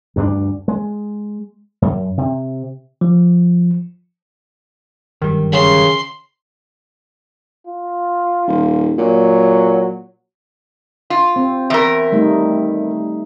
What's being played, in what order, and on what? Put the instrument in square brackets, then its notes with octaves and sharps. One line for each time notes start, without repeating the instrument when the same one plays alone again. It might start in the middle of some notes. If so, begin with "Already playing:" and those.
[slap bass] D2 G2 G#3 D4
G#3
F#2
C3
[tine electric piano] F3
[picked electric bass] G1 F#2 G3 [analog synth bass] D#3
[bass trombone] C#3 [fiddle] C6
[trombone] F4
[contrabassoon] D#1
[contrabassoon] A#2 [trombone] F#3
[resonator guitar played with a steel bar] F4
[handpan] C4
[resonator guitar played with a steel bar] E2 A#4 [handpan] E5
[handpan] G3 A3 D#4